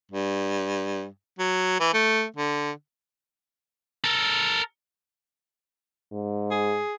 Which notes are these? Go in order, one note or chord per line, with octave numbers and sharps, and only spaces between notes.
G2
F#3
E3
A3
D3
A4 A#4
G#2
G#4